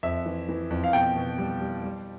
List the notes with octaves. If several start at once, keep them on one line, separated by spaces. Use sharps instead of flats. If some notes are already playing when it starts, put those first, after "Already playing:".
F2 E5
E3
E3
F2
F5
B2 G5
B2
G3
G3
G3